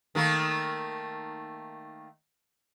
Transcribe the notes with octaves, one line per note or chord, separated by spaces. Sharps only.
D#3 A3 A#3